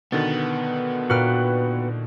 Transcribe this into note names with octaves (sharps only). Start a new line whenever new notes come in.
B2 D3 D#3 B3 A6
A#2 F#4 B4 G5 F6